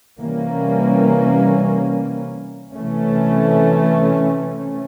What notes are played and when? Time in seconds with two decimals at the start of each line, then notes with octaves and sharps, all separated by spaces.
0.19 C3 E3 G3 A#3 C#4
2.75 C3 E3 A3 C#4